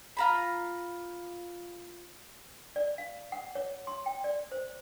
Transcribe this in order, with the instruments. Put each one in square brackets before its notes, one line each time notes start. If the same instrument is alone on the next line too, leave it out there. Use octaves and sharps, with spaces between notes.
[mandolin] F4 A#5 B5
[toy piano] D5
F5
F#5
C#5
C6
G5
D5
C5